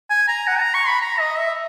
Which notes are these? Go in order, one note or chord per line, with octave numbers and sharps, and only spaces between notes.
G#5
A#5
F#5
A#5
C#6
B5
A#5
D#5
E5